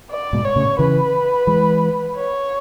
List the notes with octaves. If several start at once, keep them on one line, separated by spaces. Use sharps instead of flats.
D5
G#2 B2
C#5
A2 C#3
C#3 E3 B4
E3 G#3
C#5